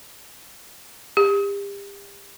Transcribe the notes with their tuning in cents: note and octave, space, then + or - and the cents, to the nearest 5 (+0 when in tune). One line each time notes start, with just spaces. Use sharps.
G4 +35